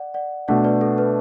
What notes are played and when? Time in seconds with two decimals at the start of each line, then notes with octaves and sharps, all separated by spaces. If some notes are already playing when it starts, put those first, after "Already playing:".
Already playing: D5 F#5
0.14 D5 F#5
0.48 B2 A3 D4 D5 F#5
0.64 B4 D5
0.81 A4
0.98 B4